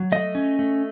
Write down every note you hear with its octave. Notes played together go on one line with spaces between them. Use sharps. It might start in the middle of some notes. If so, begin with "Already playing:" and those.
Already playing: F#3
A3 D#5
C#4
A3